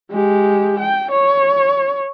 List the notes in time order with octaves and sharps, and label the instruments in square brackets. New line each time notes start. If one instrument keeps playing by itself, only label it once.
[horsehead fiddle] G#3 G4
G5
C#5